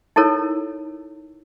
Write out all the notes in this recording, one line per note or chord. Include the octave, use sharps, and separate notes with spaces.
D#4 E4 A4 A#4 C#5